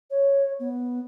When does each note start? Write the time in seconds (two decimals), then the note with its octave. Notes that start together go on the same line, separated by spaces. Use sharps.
0.10 C#5
0.59 B3